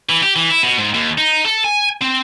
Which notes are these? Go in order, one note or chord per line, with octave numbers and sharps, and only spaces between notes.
E3
G4
E3
E4
B2
G#2
D#2
D#4
A4
G#5
C4